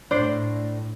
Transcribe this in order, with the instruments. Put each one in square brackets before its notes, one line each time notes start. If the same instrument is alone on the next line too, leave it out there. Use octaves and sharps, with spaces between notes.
[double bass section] A2 [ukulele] D4 C5 D5